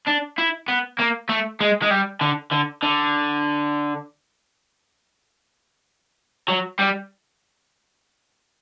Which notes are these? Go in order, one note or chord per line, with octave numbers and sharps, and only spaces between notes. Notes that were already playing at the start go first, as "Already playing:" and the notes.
D4
E4
B3
A#3
A3
G#3
G#3
G3
D3
D3
D3
F#3
G3